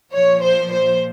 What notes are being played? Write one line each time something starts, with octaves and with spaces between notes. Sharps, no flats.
A#2 F3 C#5
C5
C5